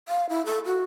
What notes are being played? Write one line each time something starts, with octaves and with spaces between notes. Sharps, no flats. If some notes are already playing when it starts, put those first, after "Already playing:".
F5
E4
A4
F#4